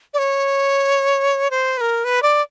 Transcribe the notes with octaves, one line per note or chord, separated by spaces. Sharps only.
D5
C#5
C5
B4
A#4
B4
D5